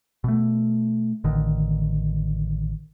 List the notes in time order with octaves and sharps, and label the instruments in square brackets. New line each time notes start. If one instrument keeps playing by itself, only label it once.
[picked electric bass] B2 A3
A1 D3 D#3